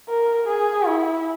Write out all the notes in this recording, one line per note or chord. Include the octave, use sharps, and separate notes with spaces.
A#4
G#4
E4